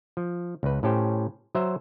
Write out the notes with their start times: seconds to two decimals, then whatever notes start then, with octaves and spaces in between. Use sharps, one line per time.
0.17 F3
0.63 C#2 B4
0.83 A2 C#4 G4 C5
1.55 F#3 C5 E5 A#5